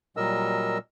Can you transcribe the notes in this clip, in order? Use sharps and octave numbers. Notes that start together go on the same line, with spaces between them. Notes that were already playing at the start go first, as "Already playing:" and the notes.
A#2 F#3 G3 A#4 D#5 E6